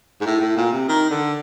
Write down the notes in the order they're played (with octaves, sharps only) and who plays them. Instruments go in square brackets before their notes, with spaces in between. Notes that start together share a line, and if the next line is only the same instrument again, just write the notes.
[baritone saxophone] G#2
A2
A2
A#2
C3
D#3
D3